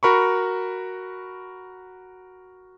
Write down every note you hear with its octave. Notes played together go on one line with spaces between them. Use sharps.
F#4 A#4 B5 C#6